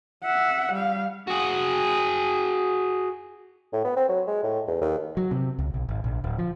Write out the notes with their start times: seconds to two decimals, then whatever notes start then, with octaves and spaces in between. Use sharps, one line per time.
0.23 E5 F#5
0.73 G3 F5
1.28 F#4 G#4
3.73 A2
3.84 B3
3.96 C4
4.08 F#3
4.27 G#3
4.43 A2
4.67 E2
4.81 D#2
5.17 F#3
5.31 C3
5.59 C#2
5.74 B1
5.89 G#1
6.04 A#1
6.24 D1
6.38 F3